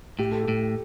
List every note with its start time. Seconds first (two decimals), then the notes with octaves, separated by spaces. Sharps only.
0.19 A2 G4
0.32 A4
0.43 G4
0.48 A2